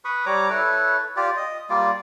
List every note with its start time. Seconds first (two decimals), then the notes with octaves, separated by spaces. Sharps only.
0.05 B4 B5 C#6 D#6
0.26 G3 C#5 A#5 D6
0.50 E4 A4 B4 C#5
1.16 F4 G4 D5
1.37 D#5
1.69 G3 A#3 F4 D5